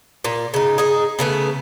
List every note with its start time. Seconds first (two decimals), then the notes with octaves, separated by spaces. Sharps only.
0.24 A#2
0.54 C#3 D#4
0.78 D#4 G#4
1.19 C#3 A3 B3